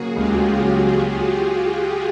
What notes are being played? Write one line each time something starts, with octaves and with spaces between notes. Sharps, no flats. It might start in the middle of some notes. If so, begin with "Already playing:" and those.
Already playing: C#3 F#3 A#3 F#4 G#4
C#2 F4 G4
C#3
F#3
F#3